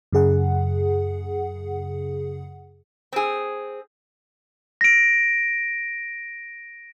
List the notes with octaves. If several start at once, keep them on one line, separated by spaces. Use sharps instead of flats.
F#2 C#3 G#4 F#5
C4 G#4
A#6 D7